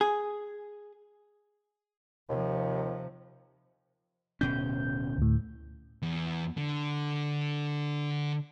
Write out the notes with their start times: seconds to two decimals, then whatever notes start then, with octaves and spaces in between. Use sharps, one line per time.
0.01 G#4
2.30 D#2 C3 F3
4.41 D1 B2 C#4 G6
5.18 D2 A2
6.02 E2
6.57 D3